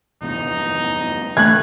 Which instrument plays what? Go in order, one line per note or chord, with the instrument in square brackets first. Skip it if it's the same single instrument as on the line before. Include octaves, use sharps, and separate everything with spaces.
[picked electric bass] F1 E2 G2 [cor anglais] D#4
[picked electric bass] G#1 C#3 [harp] A3 [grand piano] F#6 G#6